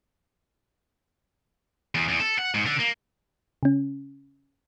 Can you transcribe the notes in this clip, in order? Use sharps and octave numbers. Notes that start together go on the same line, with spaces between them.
E2
E2
A4
F#5
G#2
D3
A#3
C#3 C#4